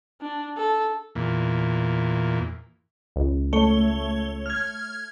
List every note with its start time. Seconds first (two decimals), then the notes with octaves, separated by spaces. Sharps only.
0.21 D4
0.57 A4
1.15 E2 A#2
3.16 C#2
3.53 A3 C#5 G7
4.46 F6 G#6